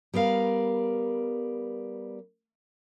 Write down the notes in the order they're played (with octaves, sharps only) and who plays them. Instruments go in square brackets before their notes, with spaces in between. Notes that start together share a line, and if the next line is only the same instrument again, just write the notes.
[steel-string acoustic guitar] G3 B3 A#4 F5